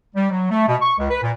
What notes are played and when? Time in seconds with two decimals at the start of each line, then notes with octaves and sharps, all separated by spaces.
0.15 G3
0.31 F#3
0.50 A3
0.68 B2
0.81 C#6
0.98 C#2
1.10 B4
1.22 A#2